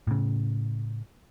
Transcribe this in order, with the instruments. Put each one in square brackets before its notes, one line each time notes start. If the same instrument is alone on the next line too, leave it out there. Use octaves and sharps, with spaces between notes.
[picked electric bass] A2 C#3